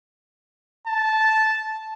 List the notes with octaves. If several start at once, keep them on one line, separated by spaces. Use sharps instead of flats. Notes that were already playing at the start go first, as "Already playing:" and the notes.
A5